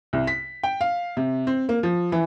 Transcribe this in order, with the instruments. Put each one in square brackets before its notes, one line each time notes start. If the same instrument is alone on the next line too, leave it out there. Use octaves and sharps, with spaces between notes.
[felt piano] C2
B6
G5
F5
C3
C4
A#3
F3
E3